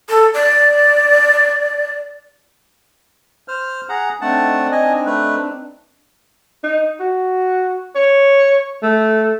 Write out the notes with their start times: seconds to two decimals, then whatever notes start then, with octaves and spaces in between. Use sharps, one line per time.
0.09 A4
0.34 D5
3.48 C5 F6
3.89 G#4 F#5 A#5
4.21 A3 C4 D4 D#4 F#5 A5
4.72 D#5 G#5
5.06 A3 B4
6.64 D#4
7.00 F#4
7.95 C#5
8.83 A3